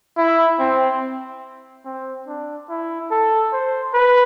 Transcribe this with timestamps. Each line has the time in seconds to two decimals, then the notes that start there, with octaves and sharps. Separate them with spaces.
0.18 E4
0.60 C4
1.85 C4
2.27 D4
2.70 E4
3.11 A4
3.53 C5
3.94 B4